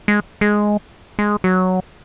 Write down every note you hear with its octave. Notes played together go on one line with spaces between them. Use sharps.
G#3
G#3
G#3
F#3